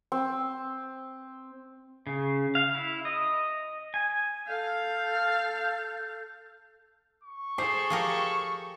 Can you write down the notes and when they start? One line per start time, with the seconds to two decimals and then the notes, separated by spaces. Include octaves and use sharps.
0.12 C4
2.07 C#3
2.55 F5
2.75 E4
3.05 D#5
3.94 G#5
4.47 A4 F5 G6
7.23 C#6
7.58 G#4 A4 C5 D6 C7
7.90 F3 G4 A#4